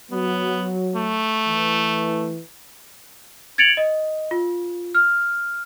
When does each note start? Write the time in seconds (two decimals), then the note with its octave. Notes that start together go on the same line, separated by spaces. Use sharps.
0.11 F#3 B3
0.96 A3
1.47 E3
3.58 G#6 A6 C#7 D7 F7 F#7
3.77 D#5
4.31 F4
4.95 F6